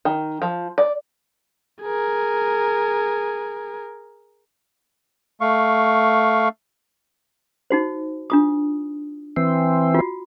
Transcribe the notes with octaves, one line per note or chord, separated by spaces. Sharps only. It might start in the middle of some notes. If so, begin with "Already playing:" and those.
D#3
F3
D5
G#4 A#4
A3 F5 C#6
D#4 F#4 C5
D4 F4 D#6
E3 C4
F4 F#4